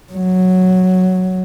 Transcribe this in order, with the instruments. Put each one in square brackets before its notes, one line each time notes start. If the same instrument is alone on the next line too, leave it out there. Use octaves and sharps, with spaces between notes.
[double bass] F#3